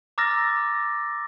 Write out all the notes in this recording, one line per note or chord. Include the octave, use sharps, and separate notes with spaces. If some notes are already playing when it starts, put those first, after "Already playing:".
A#5 D6 E6 F6 A6 A#6